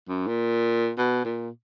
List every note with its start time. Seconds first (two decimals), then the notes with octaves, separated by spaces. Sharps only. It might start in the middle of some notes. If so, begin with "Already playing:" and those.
0.08 F#2
0.27 A#2
0.98 B2
1.25 A#2